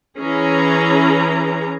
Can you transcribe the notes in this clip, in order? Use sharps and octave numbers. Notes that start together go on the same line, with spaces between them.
E3 C#4 G#4 A#5